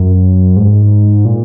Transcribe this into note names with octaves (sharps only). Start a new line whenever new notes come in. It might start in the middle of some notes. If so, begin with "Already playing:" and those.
Already playing: F#2
G#2
A#2